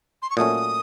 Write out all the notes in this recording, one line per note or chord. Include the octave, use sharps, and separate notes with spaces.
C6
C#6
A#2 F#3 A3 C#4 D#6